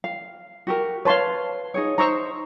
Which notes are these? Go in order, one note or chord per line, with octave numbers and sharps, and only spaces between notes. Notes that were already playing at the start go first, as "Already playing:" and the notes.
F5
F#4 G4 A#4
B4 C#5 F5 A5 C6
D#4 G#4 C#5
D#4 C5 A#5 C#6 E6